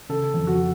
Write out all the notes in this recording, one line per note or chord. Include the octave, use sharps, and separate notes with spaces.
C#3 A4
F2
F#4